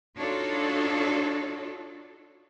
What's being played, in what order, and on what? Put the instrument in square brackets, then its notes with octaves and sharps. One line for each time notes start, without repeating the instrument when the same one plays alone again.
[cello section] D4 D#4 F4 F#4 A4 C#5